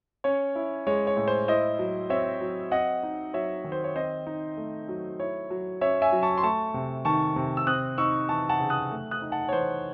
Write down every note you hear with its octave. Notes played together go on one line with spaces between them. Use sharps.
C#4 C#5
E4
G#3 C#5
C#5
A2
C5
E4 C5 D#5
F#3
C4 C#5 E5
F#3
C4 D#5 F#5
D#4
F#3 C#5 E5
D#3
C5
C#5
C4 C5 D#5
D#4
A3
F#3
E4 C#5
F#3
C#4 C#5 E5
E5 G#5
F#3
A5 C#6
C6
A3 A5 C#6
C3
D#3 A5 C#6
C3
E6
C4 D#6 F#6
D#4 C#6 E6
E3 A5 C#6
F#5 A5
C#3
D#6 F#6
A3
D#6 F#6
D#4
F#5 A5
C#5
E3 C5